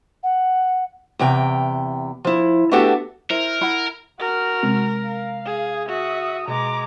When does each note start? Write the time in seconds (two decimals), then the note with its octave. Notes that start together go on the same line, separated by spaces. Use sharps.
0.23 F#5
1.19 E2 C3 G5
2.24 F3 E4
2.71 A3 B3 D4 F#4 G4 A4
3.30 E4 A#4 C5
3.61 E4 F#5 B5
4.19 F#4 A#4 F6
4.63 C3 G#3 C4
5.06 F5
5.46 G#4
5.89 F#4 E5 D#6
6.48 B2 G#3 A#5 D6